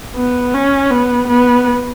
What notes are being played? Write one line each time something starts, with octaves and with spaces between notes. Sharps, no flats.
B3
C#4
B3
B3